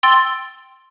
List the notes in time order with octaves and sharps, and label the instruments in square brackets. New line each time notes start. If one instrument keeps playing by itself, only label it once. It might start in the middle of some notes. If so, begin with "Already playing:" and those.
[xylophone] G5 C6 E6 A6 G7